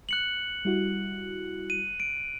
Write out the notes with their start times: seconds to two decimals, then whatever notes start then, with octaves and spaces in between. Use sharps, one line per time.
0.09 F#6 C#7 F#7
0.65 G3 E4 F#4
1.70 D#7
2.00 D7